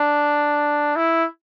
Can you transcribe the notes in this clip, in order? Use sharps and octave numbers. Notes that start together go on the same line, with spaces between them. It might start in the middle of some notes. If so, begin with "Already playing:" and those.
Already playing: D4
E4